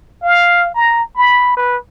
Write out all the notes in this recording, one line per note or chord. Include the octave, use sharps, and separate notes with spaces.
F5
A#5
B5
B4